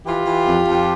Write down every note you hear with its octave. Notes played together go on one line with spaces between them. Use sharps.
E3 F4 G4
E3
F2
F2